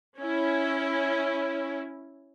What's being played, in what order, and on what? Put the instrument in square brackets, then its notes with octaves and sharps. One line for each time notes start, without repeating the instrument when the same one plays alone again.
[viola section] C#4 E4